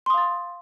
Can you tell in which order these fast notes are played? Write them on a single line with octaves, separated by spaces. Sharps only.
C6 D#6 F5 A6